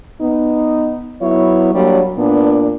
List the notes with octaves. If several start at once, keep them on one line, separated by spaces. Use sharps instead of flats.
B3 D#4
F#3 B3 E4 C#5
F#3 G3 A#3 D4
A#2 B3 D4